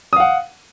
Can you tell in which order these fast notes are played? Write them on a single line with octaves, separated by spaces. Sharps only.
D#6 F5 F#5